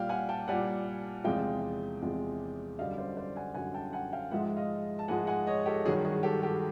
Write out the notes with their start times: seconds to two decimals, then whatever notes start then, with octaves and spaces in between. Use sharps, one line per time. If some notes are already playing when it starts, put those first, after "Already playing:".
Already playing: A#2 G3 F5 G5
0.09 F#5 G#5
0.29 G5 A5
0.48 A#2 G3 F#5 G#5
1.24 E2 C3 F3 G#3 F5 G5
2.02 E2 C3 F3 G#3
2.78 F#2 D3 G3 D#5 F5
2.98 C5 D5
3.16 C5 D5
3.36 F#5 G#5
3.54 F#2 D3 G3 F#5 G#5
3.74 G5 A5
3.93 F#5 G#5
4.13 F5 G5
4.31 G#2 F3 G#3 E5 F#5
4.57 D#5 F5
4.99 A5
5.08 G#2 F3 G#3 F#5 G#5
5.27 F#5 G#5
5.47 C#5 D#5
5.66 G4 A4
5.85 G2 D#3 F#3 F#4 G#4
6.05 F#4 G#4
6.23 G4 A4
6.43 G4 A4